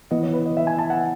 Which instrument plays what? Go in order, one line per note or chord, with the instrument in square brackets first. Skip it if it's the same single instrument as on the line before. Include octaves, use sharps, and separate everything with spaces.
[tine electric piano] E3 B3 E4 [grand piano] D#5
[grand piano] C#5
B4
D#5
E5
G#5
A5
F#5